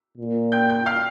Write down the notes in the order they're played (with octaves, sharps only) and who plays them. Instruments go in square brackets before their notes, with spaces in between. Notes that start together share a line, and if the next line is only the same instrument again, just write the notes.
[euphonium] A#2
[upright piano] G5 G6
G5 G6
F5 F6